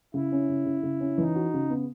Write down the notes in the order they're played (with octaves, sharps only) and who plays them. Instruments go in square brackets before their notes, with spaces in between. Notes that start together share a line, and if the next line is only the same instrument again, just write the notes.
[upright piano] C#3 [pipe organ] E4
[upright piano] C#4
C#3
C#3
C#3
C#4
[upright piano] E3 [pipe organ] D#4
[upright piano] F#4
C#3
B3